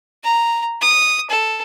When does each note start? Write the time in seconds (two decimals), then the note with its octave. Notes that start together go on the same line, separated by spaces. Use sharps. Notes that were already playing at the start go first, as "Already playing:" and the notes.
0.24 A#5
0.81 D#6
1.30 A4